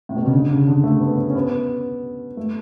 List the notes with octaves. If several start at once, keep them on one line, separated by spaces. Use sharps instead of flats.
A2
B2
C#3
D3
C#3
D3
A3
B3
C#4
C#4
B3
A3